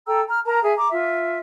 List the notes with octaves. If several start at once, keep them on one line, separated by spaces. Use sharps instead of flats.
A4 G5 A#5 E6
A#5 F6
A#4 A5 A#5
G#4 E5
A#5 D6
F4 E5